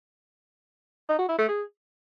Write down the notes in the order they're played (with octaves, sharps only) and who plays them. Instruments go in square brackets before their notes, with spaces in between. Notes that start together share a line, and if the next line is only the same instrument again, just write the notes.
[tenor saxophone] D#4
F#4
E4
A3
G#4